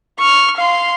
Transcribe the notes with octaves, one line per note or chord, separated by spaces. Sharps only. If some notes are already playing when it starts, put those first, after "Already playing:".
C#6 F6
F5 C6